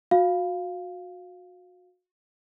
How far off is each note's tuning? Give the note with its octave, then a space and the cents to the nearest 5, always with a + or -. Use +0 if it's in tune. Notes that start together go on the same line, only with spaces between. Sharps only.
F#4 -30 F5 +0